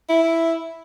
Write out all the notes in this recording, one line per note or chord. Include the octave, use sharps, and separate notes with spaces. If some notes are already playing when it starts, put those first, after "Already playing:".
E4